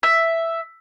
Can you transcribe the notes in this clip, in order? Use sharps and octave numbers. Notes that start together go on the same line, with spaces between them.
E5